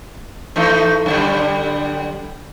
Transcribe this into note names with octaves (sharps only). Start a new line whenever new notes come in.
E3 A3 D#4
F#2 D3 G3